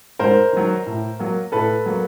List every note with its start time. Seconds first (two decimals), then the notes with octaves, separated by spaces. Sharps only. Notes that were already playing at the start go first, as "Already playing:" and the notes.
0.19 G#2 A#4 C5
0.53 D#3 F#3
0.86 A2
1.19 F#3 A#3
1.52 A2 A4 B4
1.86 F#3 A#3